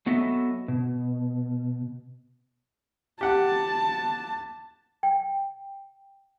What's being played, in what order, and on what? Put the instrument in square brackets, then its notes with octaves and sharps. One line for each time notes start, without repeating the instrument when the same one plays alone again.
[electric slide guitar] F#3 B3 F#4 A4 D#5 E5
B2
[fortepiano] G4 F#5 [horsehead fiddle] A5
[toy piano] G5